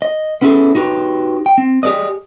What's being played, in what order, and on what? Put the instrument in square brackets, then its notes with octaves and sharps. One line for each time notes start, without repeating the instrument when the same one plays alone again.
[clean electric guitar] D#5
B3 C#4 E4 F#4 G#4 A4
D#4 F#4 G4 B4
G5
C4
G4 G#4 B4 D5 D#5